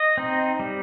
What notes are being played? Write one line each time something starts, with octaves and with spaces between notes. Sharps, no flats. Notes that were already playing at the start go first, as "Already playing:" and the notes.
Already playing: D#5
C4 D#4
G3